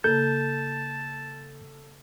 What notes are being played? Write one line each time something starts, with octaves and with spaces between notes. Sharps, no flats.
C#3 A#3 A4 A5 G6